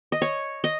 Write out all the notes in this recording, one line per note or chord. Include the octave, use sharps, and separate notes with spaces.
D#5
C#5
D#5